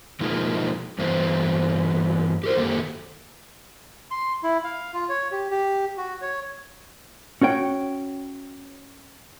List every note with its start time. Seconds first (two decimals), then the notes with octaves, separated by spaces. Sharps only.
0.20 B2 F3 G#3 A#3 D#4 F4
0.98 G2 E3 F#3 B3 C5 F5
2.44 G4 A#4 C5
2.57 F#2 D#3 A#3 G4 A4
4.11 C6
4.43 E4
4.64 F5
4.93 F4
5.09 C#5
5.32 G4
5.51 G4
5.97 F#4
6.22 C#5
7.41 C#4 F#4 C#5 G5